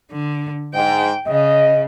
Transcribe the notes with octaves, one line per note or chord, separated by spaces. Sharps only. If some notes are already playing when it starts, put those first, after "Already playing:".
D3
G#2 G5
C#3 D#5